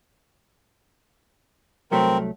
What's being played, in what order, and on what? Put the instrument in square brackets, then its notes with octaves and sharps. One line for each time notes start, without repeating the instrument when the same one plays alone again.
[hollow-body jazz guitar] C2 F#3 A3 [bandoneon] C4 A#4